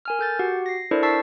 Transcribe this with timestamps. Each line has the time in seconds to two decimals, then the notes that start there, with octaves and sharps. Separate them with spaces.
0.05 A#4 G#5 F6
0.19 A4 G6 A6
0.39 F#4 G4 F#5
0.66 A#6 C7
0.91 D4 E4 A4 A#4 C5 D5
1.03 A5 C#6 E6 A6 B6 C7